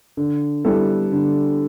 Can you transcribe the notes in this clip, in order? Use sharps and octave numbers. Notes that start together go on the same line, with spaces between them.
D3
G3 B3 E4 A4
D3